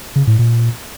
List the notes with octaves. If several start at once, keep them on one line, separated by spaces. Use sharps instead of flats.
C#3
A2
A#2